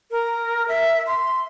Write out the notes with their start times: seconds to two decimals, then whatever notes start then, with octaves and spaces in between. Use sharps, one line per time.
0.11 A#4
0.68 E5
1.07 C6